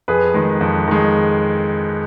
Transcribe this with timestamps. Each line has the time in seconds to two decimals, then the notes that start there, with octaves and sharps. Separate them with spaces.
0.08 F2 G#4 B4
0.34 D#3 G#3
0.61 F2
0.87 D#3 G#3